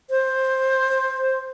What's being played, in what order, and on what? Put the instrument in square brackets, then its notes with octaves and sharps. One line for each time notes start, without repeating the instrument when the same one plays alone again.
[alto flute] C5